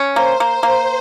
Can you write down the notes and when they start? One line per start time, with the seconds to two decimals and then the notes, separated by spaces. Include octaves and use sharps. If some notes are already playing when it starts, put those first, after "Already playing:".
Already playing: C#4
0.16 A#3 C5
0.40 A#3
0.63 A#3